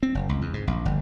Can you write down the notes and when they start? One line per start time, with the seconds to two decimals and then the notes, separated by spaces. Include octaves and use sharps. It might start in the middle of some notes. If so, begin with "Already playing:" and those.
0.03 C4
0.15 F#1
0.29 C#2
0.41 E2
0.54 G#2
0.67 A#1
0.85 G1